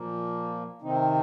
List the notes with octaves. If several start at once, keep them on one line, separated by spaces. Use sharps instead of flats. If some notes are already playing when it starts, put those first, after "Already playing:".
Already playing: A#2 F3 A#3
C3 D#3 C4 D#4